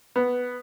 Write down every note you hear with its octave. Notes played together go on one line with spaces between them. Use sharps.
B3